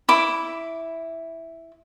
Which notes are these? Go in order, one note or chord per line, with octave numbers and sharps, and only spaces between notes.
E4 D6